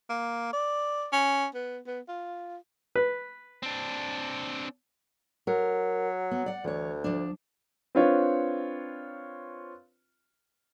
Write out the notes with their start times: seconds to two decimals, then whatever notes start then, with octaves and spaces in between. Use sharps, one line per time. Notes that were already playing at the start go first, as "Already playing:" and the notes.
0.10 A#3
0.53 D5
1.13 C#4
1.55 B3
1.87 B3
2.08 F4
2.96 B4
3.63 C4 D4
5.47 F#3 A#4
6.31 B3
6.46 D5 F#5
6.64 D2 E3 C#5
7.04 F3 D4
7.95 C4 D4 F4 B4 C#5